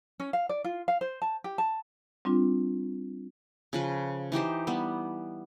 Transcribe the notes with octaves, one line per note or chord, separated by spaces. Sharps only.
C#4
F5
D5
F4
F5
C5
A5
G4
A5
G3 C4 D4 F4
C#3 F3 B4
E3 D#4 G4 C5
G3 B3